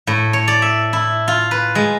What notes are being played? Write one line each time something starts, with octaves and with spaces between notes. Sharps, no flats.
A2
C#5
D5
E5
E4
F4
B4
G#3